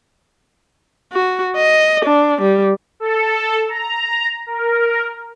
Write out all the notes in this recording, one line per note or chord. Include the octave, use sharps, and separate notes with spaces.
F#4
D#5
D4
G3
A4
A#5
A#4